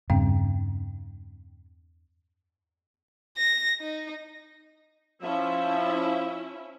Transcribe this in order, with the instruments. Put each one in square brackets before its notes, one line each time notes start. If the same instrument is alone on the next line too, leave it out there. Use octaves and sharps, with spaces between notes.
[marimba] E2 C4 G5 [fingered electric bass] G2 C#3
[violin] A#6
D#4
[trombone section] F3 [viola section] C#4 E4 E5